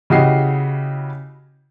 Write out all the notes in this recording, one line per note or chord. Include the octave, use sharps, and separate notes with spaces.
C#3 E4 F#4 G4 D#5 C7